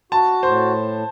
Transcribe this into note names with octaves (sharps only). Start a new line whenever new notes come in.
F#4 A5
A2 C5